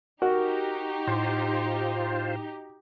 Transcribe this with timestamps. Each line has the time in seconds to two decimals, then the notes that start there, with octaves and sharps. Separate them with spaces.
0.22 D#4 F#4 G4 A#4
1.07 A2 F4 C5